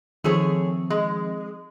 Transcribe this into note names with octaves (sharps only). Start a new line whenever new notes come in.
D#3 F3 A3 C4 G#4 C#5
G#3